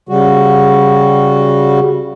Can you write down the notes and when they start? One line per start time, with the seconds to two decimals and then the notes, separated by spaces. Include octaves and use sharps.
0.09 C#3 G3 F#4